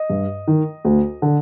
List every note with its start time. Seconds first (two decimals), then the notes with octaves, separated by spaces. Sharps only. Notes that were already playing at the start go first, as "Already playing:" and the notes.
Already playing: D#5
0.10 G2
0.48 D#3
0.85 D2
1.22 D3